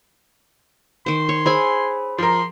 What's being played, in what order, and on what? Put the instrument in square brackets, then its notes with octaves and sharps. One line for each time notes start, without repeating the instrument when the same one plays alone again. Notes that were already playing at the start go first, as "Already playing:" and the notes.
[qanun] D#3 C5 [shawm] C6
[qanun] C#5
[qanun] G#4 E5 G#5 [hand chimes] C5 B5
[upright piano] F3 A#4 [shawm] C6